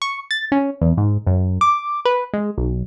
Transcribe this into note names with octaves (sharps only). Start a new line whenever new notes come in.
C#6
A6
C#4
E2
G#2
F#2
D6
B4
G#3
B1